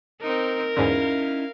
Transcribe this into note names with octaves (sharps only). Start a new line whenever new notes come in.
C4 D#4 A#4
E2 G#2 D3 C#4 D#4 E4 F5